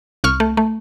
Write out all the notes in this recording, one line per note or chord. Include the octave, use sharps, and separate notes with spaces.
C2 C#6 F6
A3
A3